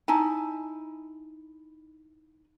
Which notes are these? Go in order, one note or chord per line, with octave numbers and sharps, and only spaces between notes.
D#4 E4 G#5 A5